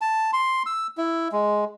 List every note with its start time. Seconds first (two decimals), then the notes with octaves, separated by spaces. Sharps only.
0.01 A5
0.33 C6
0.66 E6
0.98 E4
1.32 G#3